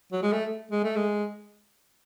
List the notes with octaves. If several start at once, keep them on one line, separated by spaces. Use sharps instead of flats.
F#3
G#3
A3
G#3
A3
G#3